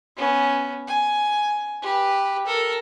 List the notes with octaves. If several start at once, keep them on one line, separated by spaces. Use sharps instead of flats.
B3 C#4
G#5
G4 B4
A4 A#4